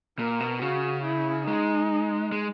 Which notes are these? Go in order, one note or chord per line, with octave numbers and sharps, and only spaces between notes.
A#2 A#4
B2
C#3 F#4
E4
G#3 D#4
G#3